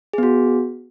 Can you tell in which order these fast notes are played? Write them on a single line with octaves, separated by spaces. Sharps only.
G#4 B3 F#4